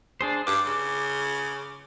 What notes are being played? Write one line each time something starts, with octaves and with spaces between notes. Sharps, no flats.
D4 G#4 C5
G2 D6
C#3